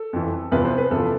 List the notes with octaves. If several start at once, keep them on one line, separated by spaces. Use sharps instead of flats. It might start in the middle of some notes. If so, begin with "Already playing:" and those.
Already playing: A4
F2 E3
E2 C3 F3 B4
C5
B4
E2 C3 F3 A4